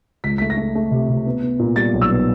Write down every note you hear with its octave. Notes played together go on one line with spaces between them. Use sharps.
C#2 B6
A3 B6
A#6
A3
A3
C3
C3
B3
B3
A#2
G3 A6
B1
E6
B3